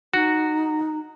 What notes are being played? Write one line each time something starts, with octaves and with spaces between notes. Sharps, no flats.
D#4 F#4